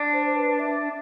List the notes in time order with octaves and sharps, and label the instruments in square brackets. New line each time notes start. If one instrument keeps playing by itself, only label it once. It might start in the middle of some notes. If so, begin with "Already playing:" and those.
Already playing: [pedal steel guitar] D4
[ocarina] C5
C5
B4
E5